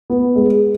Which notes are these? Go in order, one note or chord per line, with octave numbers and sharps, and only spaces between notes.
B3
G#3